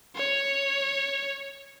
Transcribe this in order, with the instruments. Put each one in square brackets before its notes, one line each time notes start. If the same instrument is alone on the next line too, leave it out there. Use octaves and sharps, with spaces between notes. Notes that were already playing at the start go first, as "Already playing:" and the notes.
[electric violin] C#5